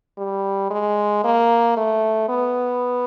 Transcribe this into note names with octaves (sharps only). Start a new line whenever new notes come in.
G3
G#3
A#3
A3
B3